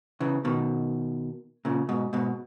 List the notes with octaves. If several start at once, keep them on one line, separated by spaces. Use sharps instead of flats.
C#3 E3
B2 D#3
A#2 C#3
G#2 B2
G#2 B2